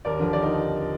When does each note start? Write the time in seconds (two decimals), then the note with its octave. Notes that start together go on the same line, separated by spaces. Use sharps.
0.05 D#2 A#4 D5
0.19 D3 F3
0.33 D#2 A#4 D5
0.43 D#4